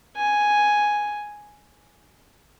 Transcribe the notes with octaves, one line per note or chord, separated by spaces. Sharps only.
G#5